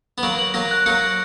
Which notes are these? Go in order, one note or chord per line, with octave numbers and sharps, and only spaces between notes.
B3
F#3 A#3 F#7
F#7
F#3 A#3 A#6
F#6
F#3 A#3 C#7
F#6